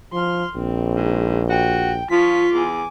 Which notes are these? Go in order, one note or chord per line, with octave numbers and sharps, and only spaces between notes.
F3 C6 F6
A#1 C4
G#2
F#4 G5
F3 F4 C#6 B6
E2 G#5 D6